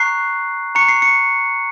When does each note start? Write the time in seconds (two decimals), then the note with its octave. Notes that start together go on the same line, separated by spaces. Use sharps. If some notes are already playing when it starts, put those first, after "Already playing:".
Already playing: A#5 C#6 F#6 C7
0.75 A#5 C#6 F#6 C#7
0.88 C7
1.02 C#7